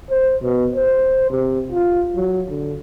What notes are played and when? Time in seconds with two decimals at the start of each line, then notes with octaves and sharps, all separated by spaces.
0.10 C5
0.42 B2
0.75 C5
1.30 C3
1.72 F4
2.16 F#3
2.49 D3